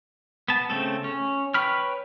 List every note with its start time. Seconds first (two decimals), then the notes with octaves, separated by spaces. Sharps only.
0.48 B3 A5
0.70 C#3 A3 C4 A4
1.04 C#4
1.54 B4 C#5 G5 B5 F6